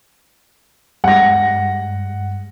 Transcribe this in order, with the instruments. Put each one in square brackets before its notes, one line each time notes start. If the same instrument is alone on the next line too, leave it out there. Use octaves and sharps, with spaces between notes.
[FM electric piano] G2 G3 G#3 [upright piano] F#5 A#6